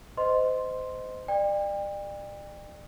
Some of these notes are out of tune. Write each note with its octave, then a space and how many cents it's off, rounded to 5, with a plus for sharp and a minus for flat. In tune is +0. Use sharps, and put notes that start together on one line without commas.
C5 -30 D#5 +0 C6 +0
D5 +35 G5 +35